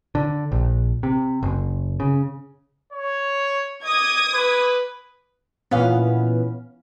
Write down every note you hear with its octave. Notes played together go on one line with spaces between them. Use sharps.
D3
A#1
C3
F#1
C#3
C#5
D#5 D6 D#6 G#6
B4
A#2 E3 B3 C#4 F5